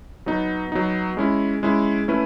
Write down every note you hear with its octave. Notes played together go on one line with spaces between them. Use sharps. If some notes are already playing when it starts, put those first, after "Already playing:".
F#3 B3 D#4
F#3 B3 D#4
G#3 C#4 E4
G#3 C#4 E4
A3 C#4 E4 B4